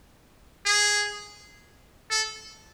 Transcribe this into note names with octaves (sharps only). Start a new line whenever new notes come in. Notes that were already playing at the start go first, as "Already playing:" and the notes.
G#4
A4